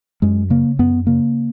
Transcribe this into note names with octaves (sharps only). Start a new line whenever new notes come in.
F#2 G#3
C#3 A#3
F#2 B3
C#3 A#3